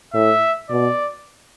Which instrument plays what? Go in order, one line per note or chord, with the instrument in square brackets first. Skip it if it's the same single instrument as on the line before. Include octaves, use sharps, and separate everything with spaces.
[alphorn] A2 [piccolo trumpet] E5
[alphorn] B2 [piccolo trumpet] D5